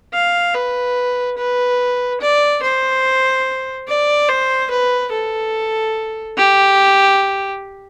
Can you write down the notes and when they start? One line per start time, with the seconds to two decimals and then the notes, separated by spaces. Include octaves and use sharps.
0.14 F5
0.54 B4
1.38 B4
2.21 D5
2.63 C5
3.88 D5
4.29 C5
4.71 B4
5.12 A4
6.38 G4